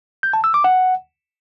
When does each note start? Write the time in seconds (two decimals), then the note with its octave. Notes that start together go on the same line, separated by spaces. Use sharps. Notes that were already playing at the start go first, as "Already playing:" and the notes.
0.23 G6
0.33 A5
0.44 E6
0.54 D6
0.64 F#5